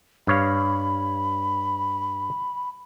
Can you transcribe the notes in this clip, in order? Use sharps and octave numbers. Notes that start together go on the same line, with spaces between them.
G2 C#5 F5 B5